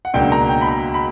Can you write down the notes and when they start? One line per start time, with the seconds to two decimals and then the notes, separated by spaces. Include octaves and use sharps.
0.05 F#5
0.14 C#2 B2 F#3 A#3 D4 G5
0.32 A#5
0.49 G5
0.61 B5
0.67 A#5
0.94 B5